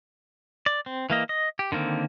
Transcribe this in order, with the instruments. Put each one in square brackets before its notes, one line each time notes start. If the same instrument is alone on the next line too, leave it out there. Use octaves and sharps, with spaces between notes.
[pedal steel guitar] D5
C4
E3 A#3 D#5
D#5
G4
D3 D#3 A#3 C4